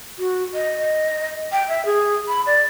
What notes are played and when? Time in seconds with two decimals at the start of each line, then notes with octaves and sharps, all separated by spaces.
0.19 F#4
0.54 D#5
1.52 G5
1.69 E5
1.86 G#4
2.28 B5
2.46 D5